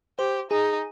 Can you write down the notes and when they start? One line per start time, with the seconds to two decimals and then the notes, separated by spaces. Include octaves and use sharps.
0.19 G4 C5
0.51 D#4 G#4